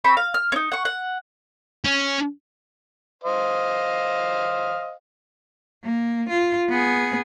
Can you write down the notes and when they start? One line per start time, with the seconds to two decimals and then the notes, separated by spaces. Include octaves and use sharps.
0.04 C4 B5 C#6
0.17 F5
0.34 F6
0.52 C#4 D#4
0.72 F#5 C#6
0.85 F#5
1.84 C#4
3.24 C5 D#5 F5
5.84 A#3
6.29 F4
6.69 B3 G#4